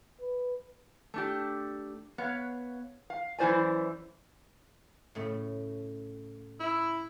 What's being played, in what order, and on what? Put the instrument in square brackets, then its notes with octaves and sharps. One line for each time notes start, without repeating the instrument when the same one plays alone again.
[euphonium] B4
[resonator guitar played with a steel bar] A3 D4 G4
B3 C#5 F5
F5
F#2 E3 E4 C5 D5 G#5
[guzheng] A2 C#3 A3
[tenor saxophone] E4